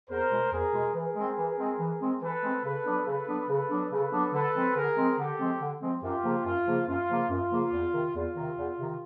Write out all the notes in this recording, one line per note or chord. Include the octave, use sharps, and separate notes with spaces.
E2 A#4 C5
B2 G#3
E2 G#4 A#4
B2 G#3
E3 G#4 A#4
G#3 C4
E3
G#3 C4
E3
G#3 C4
E3 A4 B4
G#3 C4
C#3 A4 B4
F#3 B3 D4
C#3 A4 B4
F#3 B3 D4
C#3 A4 B4
F#3 B3 D4
C#3 A4 B4
F#3 B3 D4
D3 A4 B4
F3 G#3 C4
D3 G#4 A#4
F3 G#3 C4
D3 G4 A4
F3 G#3 C4
D3
F3 G#3 C4
F#2 F4 G4
C#3 F3 A#3
F#2 F4
C#3 F3 A#3
F#2 F4
C#3 F3 A#3
F#2 F4
C#3 F3 A#3
E2
C3 D#3
E2 F4
C3 D#3
E2
C3 D#3